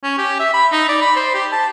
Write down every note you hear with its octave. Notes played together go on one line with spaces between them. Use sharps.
C#4
G4
E5
B5
D#4
D5
B5
C5
G4
A5